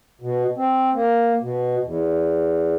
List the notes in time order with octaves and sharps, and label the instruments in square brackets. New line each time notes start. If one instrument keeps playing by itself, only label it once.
[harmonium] B2
C4
A#3
B2
E2